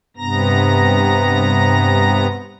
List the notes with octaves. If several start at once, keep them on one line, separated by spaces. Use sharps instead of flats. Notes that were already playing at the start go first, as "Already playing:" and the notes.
G2 C3 B3 A#5 A#6